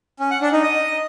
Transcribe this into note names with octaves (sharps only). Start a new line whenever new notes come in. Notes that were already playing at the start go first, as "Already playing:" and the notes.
C#4
F#5
D4
D#4
D#5